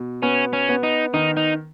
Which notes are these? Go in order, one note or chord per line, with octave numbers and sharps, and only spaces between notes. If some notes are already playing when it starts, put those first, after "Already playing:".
Already playing: B2
B3 C#4
C#4
B3
D#4
D#3 D#4
D#4